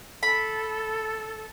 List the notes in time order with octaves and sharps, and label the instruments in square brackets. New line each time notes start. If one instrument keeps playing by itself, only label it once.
[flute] A4 [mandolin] B5